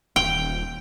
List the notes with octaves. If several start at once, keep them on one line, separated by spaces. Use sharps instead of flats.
D#1 G5